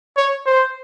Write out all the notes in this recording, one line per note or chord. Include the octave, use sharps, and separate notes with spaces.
C#5
C5